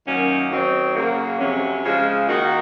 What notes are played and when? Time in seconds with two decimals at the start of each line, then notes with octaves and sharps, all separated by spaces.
0.06 F#2 D#3 A#3 C#4
0.51 D#3 F#3 C4 D#4
0.94 C#3 F#3 A#3
1.38 F2 C3 F#3 C#4
1.84 C#3 F3 G#3
2.28 D#3 A#3 D#4 F#4